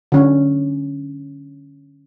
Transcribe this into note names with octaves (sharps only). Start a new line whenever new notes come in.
D3 C#4